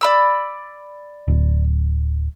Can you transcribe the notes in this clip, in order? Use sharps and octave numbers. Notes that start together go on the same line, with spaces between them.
D5 B5 E6
D1